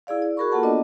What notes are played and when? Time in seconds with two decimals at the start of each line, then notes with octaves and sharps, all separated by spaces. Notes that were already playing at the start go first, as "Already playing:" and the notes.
0.07 E4 G#4 D5 F5
0.22 D5
0.37 F#4 G#4 A#4 B5 C#6
0.52 A#3 F4 F#4 A4 F#5 A5
0.63 B3 D4 D5 D#5